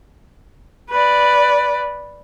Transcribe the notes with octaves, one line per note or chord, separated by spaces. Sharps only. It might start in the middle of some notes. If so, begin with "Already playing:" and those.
B4 D5